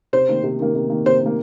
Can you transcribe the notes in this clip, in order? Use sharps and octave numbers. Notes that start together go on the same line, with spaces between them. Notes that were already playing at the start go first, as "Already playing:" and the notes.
C3 C5
D#3 A#3
C3
D#3 A#3
C3
D#3 A#3
C3 C5
D#3 A#3